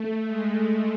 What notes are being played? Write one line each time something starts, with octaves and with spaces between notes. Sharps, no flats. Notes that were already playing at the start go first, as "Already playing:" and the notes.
Already playing: A3
G#3